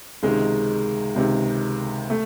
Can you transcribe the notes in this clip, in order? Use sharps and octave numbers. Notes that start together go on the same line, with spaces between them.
C#2 C3 D#3 G#3
C#2 C3 D#3
A3